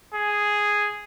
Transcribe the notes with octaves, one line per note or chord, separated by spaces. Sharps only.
G#4